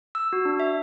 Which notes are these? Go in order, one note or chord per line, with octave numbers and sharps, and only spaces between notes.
E6
F#4
D4
E5